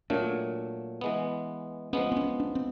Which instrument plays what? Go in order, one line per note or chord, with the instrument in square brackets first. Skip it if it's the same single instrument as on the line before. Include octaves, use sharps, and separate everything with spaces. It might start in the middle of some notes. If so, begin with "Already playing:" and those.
[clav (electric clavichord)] A#2 F#3 A3 [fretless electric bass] D4
[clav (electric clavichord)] E3 G#3 B3
[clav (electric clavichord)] F3 G#3 B3 [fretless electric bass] C#4
[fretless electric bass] C4
C#4
D4
C4